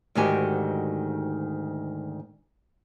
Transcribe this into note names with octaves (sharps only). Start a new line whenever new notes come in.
D2 G#2 D#3 F#4 G4 G#5